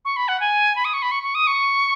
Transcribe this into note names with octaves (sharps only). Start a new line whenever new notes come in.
C#6
B5
F#5
G#5
B5
D#6
C#6
B5
C#6
C#6
D#6
C#6